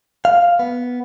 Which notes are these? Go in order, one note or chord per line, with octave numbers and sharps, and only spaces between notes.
F5
B3